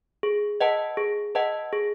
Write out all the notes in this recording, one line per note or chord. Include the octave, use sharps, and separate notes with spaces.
G#4
B4 D#5 F#5 A5
G#4
B4 D#5 F#5 A5
G#4